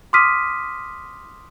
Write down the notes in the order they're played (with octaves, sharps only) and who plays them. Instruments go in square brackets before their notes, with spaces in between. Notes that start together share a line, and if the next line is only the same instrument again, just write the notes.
[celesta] C6 D6 D#6 F6 B6 D#7